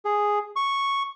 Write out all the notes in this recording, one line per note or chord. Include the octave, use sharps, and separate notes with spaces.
G#4
C#6